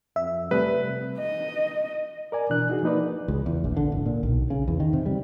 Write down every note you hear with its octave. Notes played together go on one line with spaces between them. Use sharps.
F2 E5
C3 G3 A3 B4
D#5
A#4 D5 G#5
B2 E3 D4 F#6
D#4 F#4 G#4
F3 A#3 D#4 B4 D5
C#2
E2
A#1
D3
D1
A#2
B1
C#3
E2
D#3
C3
G3